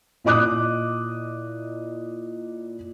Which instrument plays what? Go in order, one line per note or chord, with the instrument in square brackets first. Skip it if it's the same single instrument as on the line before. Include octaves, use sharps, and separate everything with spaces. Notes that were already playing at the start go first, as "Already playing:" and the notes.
[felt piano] A#2 E4 D#5 D6 D#6 F#6